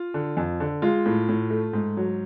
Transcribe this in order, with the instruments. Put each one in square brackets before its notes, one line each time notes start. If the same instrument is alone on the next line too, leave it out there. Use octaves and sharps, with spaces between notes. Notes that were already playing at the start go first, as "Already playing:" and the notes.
Already playing: [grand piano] F4
D3
F2
D3
G#3 F4
A2
A2
A3
G#2
F#3